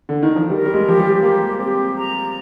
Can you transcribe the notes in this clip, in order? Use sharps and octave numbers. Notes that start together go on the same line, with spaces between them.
D3
D#3
F3
G3 A#4
G3
G#3
F3 G4
G3
A#3 G4
C4 G4
A#5